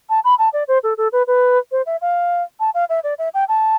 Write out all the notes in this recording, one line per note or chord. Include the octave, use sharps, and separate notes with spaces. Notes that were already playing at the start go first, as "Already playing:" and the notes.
A5
B5
A5
D5
C5
A4
A4
B4
B4
C5
E5
F5
A5
F5
E5
D5
E5
G5
A5